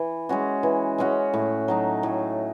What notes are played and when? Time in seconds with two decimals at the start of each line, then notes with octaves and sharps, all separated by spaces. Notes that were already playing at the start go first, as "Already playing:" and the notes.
Already playing: E3
0.29 G#3 C#4 F#4
0.63 E3
0.98 G#3 C#4 F#4
1.33 A2
1.68 F#3 A3 D#4
2.03 A2